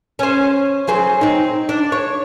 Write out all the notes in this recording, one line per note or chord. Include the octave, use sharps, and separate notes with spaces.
C#4 C5
F#3 G#4 C5
C4 D#4
D4
C#5